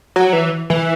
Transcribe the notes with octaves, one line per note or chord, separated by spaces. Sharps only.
F#3
E3
E3